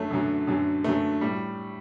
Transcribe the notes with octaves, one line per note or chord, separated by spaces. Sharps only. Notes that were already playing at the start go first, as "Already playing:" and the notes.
Already playing: F#2 D3 F#3 A3
F#2 D3 F#3
F#2 D3 F#3
F#2 D3 F#3 A3
A2 G3